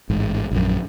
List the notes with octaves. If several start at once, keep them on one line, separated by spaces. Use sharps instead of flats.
A1 G#2
A#1 F#2